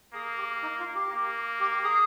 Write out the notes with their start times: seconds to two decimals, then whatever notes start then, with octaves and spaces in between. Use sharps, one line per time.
0.14 A#3 G#4
0.38 G4
0.62 D#4
0.79 F4
0.95 G4
1.12 A#3
1.60 G4
1.84 G#4